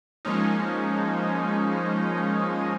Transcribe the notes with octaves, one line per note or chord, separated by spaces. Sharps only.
F3 G#3 A#3 C#4 D#4